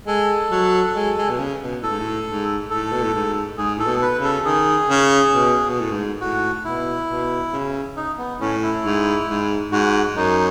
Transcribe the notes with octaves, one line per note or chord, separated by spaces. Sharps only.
G#3 A4
F#3
G#3
G#3
B2
C#3
B2
A2 A4
G#2
A2
G#2
A2 A4
B2
A2
G#2
G#2 G#4
A2 A4
B2
B4
C#3
A4
D#3 G#4
C#3
B2
B2
A2
G#2
A2 F#4
B2 E4
B2
C#3
D#4
B3
A2 C#4
E4
G#2
G#2
G#2 F#4
F#2 D#4